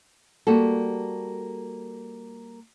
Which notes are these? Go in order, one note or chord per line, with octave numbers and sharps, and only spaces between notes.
G3 A#3 F#4 A4